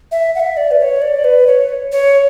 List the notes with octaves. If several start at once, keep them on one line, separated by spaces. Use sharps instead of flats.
E5
F#5
E5
D5
B4
C#5
D5
B4
C#5
C#5